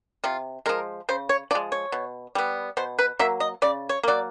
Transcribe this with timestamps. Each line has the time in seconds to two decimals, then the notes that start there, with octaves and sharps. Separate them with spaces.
0.24 C3 F4
0.66 F3 G#3 A#4
1.09 C#3 C5
1.29 C#5
1.51 F3 D5
1.55 G#3
1.72 C#5
1.92 B2
2.35 G3 B3
2.77 B2 C5
2.99 B4
3.19 F#3 A#3 E5
3.40 D#5
3.62 C#3 D5
3.89 C#5
4.03 F#3 A#3 D5